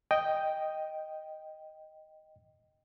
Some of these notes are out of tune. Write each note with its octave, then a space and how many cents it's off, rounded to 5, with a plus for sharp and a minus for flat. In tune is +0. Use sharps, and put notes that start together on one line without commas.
D#5 +0 G5 +0